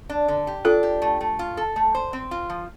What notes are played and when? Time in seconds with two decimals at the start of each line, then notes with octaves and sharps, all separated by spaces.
0.09 D4
0.28 D3
0.47 G4
0.65 D4 F4 A4
0.83 G4
1.02 A3
1.21 A3
1.39 F4
1.57 A4
1.76 A3
1.95 C5
2.13 C4
2.31 F4
2.50 F3